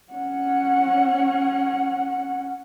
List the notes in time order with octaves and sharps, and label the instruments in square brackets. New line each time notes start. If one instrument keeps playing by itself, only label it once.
[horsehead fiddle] C#4 F#5